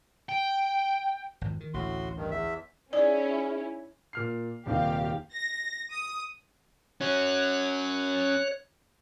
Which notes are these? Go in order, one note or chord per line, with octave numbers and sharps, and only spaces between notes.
G5
G#1 F2
D#3
A1 D2 A2 F#4 C6
G2 D#3
E2 E5
C#4 D#4 E4 G#4 D5
A#2 F6 C7
D#1 C3 D#3 G4 F5
A#6
D#6
C#4 F#4 C#5 F#6